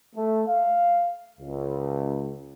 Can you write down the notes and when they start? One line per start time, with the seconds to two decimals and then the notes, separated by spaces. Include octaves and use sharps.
0.15 A3
0.48 F5
1.39 C#2